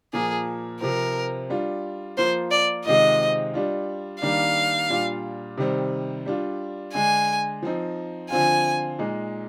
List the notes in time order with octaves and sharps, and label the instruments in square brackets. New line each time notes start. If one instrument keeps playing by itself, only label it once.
[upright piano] A#2 F3 A#3 [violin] G#4
[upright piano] C3 F3 C4 [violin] A#4
[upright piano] G3 D4 F4
[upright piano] F3 A#3 F4 [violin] C5
[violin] D5
[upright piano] C3 D#3 G#3 C4 F4 [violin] D#5
[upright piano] G3 D4 F4
[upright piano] D#3 G3 A#3 D4 [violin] F5
[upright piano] A#2 G3 D4 F4
C3 D#3 G3 C4
G3 D4 F4
[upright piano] D3 G#3 D4 [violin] G#5
[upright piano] F3 C4 D#4
[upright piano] D3 F3 C4 F4 [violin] G#5
[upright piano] A#2 G#3 D#4